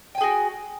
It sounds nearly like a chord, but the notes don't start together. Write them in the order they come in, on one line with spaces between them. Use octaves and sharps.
G5 G#5 G#4 F#4